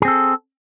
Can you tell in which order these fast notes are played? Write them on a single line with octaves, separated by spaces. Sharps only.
G#4 C4 A4